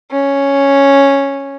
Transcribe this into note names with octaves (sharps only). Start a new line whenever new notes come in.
C#4